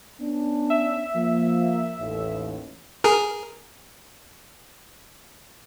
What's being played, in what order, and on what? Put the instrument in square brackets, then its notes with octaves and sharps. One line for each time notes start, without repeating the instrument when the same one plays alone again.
[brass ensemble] B3 C#4 D4
[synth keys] E5
[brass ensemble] F3 A#3
A1 D#2
[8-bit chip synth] G#4 A#4